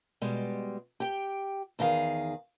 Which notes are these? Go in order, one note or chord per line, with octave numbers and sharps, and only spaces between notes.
B2 G3 G#3
G4 G5
E2 D#3 G#4 F5